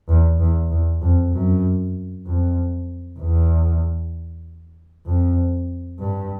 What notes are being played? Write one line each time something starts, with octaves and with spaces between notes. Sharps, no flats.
E2
E2
E2
F2
F#2
F2
E2
F2
G2